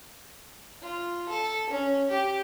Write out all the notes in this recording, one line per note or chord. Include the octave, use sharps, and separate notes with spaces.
F4
A4
C#4
G4